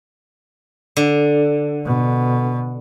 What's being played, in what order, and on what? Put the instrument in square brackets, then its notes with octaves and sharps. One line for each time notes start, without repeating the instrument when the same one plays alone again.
[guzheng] D3
[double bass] B2